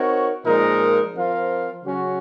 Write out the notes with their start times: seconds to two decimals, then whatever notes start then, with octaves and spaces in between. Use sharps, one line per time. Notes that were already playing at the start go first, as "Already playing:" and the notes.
Already playing: C4 D#4 F#4 A#4 C#5
0.45 A#2 F3 G#3 D#4 A#4
1.15 F3 C4 F4 A#4 F5
1.84 C#3 F#3 C#4 F#4